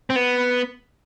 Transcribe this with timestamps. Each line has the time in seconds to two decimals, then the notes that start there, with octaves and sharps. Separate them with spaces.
0.10 C4
0.16 B3